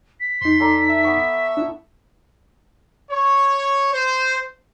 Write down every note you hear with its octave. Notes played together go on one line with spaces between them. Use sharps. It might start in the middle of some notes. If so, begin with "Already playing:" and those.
B6
F2 D#4 C6
A4 D5 A#5
E5
B3 C#6
D4 E4
C#5
C5